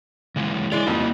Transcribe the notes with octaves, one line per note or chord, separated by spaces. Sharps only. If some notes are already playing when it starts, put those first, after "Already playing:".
C#3 E3 G#3
E3 G#3 C#5 D5
F2 A#3 E4 F#4